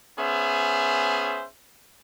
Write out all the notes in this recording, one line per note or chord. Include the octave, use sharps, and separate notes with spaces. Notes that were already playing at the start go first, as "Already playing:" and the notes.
B3 C#4 G#4 C5 E5